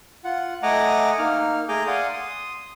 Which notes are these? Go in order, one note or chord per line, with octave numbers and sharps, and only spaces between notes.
F4 F#5
A3 D#5 F#5 G#5 A#5 D6
A#3 D#4 F6
A3 G#4 G#5 A#5 D6 G6
D5 F5 F#5 G#5 C6 D#6
C6 D#6